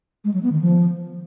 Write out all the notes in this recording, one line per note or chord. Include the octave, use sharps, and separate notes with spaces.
G#3
F#3
B3
D#3
F3